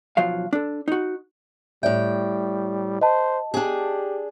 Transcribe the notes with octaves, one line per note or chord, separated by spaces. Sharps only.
B1 F3 F#3 F5
D4 A4
D#4 F#4
A2 G3 D5 E5 G5
C5 D#5 A5
D4 G4 G#4